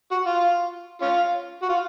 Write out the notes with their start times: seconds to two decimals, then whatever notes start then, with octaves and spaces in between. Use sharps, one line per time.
0.11 F#4
0.26 F4
1.01 C#4 F4
1.62 F#4
1.69 F4